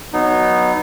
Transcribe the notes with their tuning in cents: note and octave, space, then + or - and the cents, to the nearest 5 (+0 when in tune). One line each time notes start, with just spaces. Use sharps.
F#3 +0 B3 +0 D#4 -15